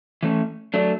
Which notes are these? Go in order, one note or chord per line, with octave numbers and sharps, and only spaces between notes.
E3 A3 C#4
F#3 A3 D4